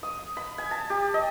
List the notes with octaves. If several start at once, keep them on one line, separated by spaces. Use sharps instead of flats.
D#6
B5
G#5
A5
G4
D#5